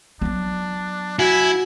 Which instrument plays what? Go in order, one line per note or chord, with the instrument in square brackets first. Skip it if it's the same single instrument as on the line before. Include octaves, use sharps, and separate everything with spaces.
[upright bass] F#3 B3 [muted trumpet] D4
[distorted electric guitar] E4 [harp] F#4 [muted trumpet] G#5